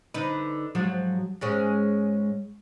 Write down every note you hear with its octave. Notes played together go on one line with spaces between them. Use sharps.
D3 D#4 B4
G#2 F3 F#3
G#2 G#3 C#4